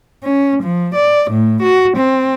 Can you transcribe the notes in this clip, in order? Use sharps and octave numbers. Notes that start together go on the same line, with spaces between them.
C#4
F3
D5
A2
F#4
C4